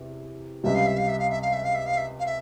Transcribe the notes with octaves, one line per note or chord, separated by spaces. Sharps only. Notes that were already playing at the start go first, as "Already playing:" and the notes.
Already playing: E2 C3
C#2 C3 G3 E5
F5
E5
F5
E5
F5
E5
F5
E5
F5
E5
F5
E5
F5
E5